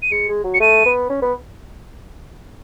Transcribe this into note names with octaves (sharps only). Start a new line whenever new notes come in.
D#7
G#3 C#7
G#3
F#3
C#7
A3 D#7
B3
C#4
B3